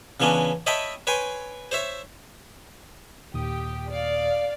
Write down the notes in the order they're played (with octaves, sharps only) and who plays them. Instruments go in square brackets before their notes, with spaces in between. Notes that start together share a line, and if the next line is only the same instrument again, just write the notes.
[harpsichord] C#3 E3 B3 C#4 D4
C#5 D#5 E5 G5 A5 B5
B4 C#5 G5 G#5 C6
C5 C#5 E5
[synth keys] D#2 A#2 D#6 [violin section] G4
[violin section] D5 F5